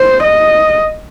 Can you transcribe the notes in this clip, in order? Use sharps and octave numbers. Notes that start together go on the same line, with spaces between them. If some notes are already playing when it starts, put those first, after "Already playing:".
Already playing: C5
D#5